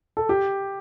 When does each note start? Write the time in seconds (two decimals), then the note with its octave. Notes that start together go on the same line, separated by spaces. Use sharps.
0.17 A4
0.29 G4